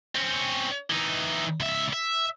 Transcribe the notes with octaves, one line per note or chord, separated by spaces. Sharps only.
C4 C#4
E3 D#4
C#2 E5
E5